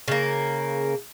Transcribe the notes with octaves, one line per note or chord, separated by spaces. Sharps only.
C#3 A#3